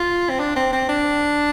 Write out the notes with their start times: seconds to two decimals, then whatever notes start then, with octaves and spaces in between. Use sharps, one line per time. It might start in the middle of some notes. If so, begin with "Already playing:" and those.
Already playing: F4
0.30 C4
0.40 D4
0.56 C4
0.73 C4
0.89 D4